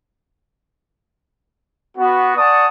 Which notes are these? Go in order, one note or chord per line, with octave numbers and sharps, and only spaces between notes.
B3 F#4
D5 F#5 G#5 A5 C#6 D#6